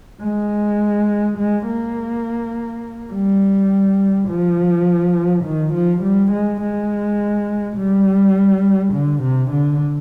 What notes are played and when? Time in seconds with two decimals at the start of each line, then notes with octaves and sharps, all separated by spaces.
0.22 G#3
1.38 G#3
1.67 A#3
3.13 G3
4.29 F3
5.45 D#3
5.74 F3
6.03 G3
6.32 G#3
6.62 G#3
7.77 G3
8.94 D3
9.23 C3
9.52 D3